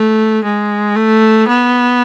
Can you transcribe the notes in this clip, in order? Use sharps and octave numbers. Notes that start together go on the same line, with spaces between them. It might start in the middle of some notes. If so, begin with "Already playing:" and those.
Already playing: A3
G#3
A3
B3